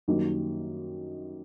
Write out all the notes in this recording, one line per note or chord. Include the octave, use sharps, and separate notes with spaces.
F#2 D#3 G3 A#3 D#4